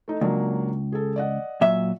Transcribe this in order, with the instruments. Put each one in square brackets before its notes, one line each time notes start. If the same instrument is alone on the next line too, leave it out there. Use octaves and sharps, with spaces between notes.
[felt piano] A3 D#4
[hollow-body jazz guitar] C#2 [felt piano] F#3 A#3 D4
[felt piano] G#4 A4
D5 D#5 F#5
[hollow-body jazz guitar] A#2 F#3 E5